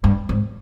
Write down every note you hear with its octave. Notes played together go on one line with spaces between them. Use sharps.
G2
G#2